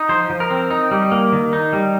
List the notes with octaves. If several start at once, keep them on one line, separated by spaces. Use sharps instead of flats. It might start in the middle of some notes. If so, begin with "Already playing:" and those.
Already playing: D#4
F3 C5
F3
A#4
C4
D#4
G3
A#3
D#3
D#4
G3